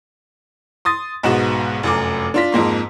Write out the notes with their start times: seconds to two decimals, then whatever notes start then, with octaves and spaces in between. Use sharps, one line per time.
0.85 C6 D#6 A6
1.23 B1 G#2 B3 F#4 E7
1.83 F1 F#2 D6
2.34 D4 F4 B6
2.52 F2 G#2 A#3 C6